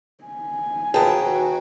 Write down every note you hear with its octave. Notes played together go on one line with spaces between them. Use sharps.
G#5
D#2 F#4 G#4 B4 G5 A5